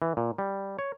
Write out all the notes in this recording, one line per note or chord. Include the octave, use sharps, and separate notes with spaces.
E3
A#2
G3
C#5